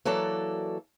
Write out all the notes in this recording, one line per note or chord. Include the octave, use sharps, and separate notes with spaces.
E3 F#3 A#3 A4 D5